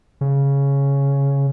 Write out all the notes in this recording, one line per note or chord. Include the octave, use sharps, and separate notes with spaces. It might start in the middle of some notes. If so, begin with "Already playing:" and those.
C#3